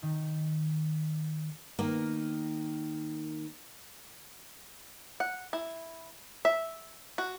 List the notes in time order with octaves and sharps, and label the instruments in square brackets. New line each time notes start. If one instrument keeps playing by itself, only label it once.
[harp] D#3
[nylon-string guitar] D#3 A#3
[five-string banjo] F#5
E4
E5
F#4